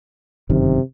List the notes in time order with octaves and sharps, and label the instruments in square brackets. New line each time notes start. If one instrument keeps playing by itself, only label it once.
[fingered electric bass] G1 F#2 D#3 [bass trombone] C3